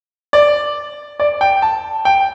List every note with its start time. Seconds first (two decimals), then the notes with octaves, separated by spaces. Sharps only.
0.33 D5
1.20 D5
1.41 G5
1.62 A5
2.05 G5